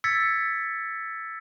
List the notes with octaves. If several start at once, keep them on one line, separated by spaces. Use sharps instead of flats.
E6 G#6 A6 B6 C#7